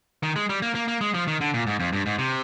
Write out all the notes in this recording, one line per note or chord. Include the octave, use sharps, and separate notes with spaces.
D#3
G#3
G3
A#3
A#3
A#3
G#3
F3
D#3
D3
A#2
G#2
F2
G2
G#2
C3